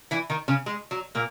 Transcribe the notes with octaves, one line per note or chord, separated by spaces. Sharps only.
E3 E4
D#3 D#4
C#3 C#4
G#3
F#3
A#2 A#3